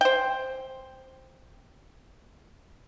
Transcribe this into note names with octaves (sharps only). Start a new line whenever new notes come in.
C5 G5